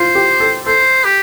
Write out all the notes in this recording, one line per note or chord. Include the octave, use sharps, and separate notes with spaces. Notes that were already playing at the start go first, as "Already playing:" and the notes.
Already playing: F4 C5
G4
A4
A4 C5
G4